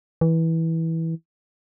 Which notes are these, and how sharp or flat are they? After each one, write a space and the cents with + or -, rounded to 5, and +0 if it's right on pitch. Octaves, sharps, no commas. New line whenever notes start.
E3 -15